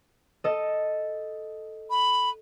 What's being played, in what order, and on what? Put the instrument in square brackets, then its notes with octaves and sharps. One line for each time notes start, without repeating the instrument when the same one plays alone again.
[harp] A4 D#5
[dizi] B5